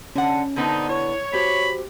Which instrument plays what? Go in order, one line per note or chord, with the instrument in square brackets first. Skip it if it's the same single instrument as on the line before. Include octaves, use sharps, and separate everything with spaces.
[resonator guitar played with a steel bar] D3 F#5 [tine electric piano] C#4
[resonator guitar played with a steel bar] D3 B3 [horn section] C4 D4 D#4
[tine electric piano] E4 [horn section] C#5
[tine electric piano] F#4 C5 [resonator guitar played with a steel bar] G4 [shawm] B5